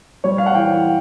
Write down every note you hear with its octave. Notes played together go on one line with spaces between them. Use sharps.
G3 C#5
F5
F#5
E3 G5